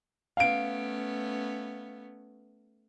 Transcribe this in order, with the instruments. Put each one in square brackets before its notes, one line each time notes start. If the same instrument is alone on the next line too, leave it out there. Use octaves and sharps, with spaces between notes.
[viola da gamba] A3 B3 C#4 [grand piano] F5 D7